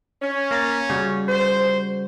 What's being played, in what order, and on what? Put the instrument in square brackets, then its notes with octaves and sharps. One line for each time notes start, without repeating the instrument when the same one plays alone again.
[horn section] C#4
[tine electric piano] A#3 A#5 A6
C#3 G3 F#4
[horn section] C5